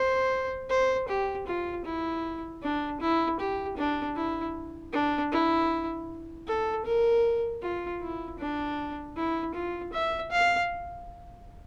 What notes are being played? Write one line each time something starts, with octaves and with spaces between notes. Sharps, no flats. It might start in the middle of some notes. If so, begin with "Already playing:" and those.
Already playing: C5
C5
G4
F4
E4
D4
E4
G4
D4
E4
D4
E4
A4
A#4
F4
E4
D4
E4
F4
E5
F5